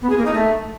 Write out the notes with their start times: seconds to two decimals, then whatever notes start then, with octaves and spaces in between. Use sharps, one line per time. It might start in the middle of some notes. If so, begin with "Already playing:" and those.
0.02 B3
0.09 G#4
0.17 A#3
0.25 D#4
0.33 A3